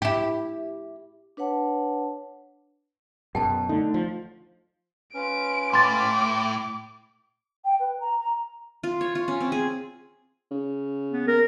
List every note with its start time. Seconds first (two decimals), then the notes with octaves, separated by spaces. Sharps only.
0.02 E4 G4
1.37 D4 B4 C#5 F#5 A5
3.35 F#2 B2 G5 A5
3.69 D3 A3 D#4
3.94 F3
5.14 C#4 F4 B4 D7
5.73 A2 C6 D6 A6
7.65 G5
7.80 B4
8.00 A#5
8.20 A#5
8.83 F4
9.01 C#5
9.15 F4
9.28 C#4
9.41 C4
9.52 G#4
10.51 C#3
11.12 B3
11.27 A#4